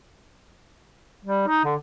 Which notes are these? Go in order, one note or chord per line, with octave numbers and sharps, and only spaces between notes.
G3
D#4
D3